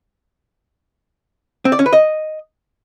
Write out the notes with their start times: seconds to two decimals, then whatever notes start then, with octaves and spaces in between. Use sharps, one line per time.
1.65 C4
1.72 D5
1.79 C#4
1.86 B4
1.93 D#5